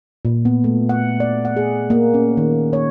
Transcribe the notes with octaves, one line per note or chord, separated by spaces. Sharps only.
A#2
B3
A3
F#5
D5
F#5
G#4
A#3
C#4
D#3
C#5